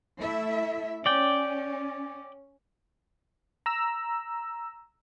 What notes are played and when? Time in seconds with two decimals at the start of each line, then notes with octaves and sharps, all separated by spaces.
0.20 A3 E4 E5
1.06 C#4 D5 G5
3.66 A#5 E6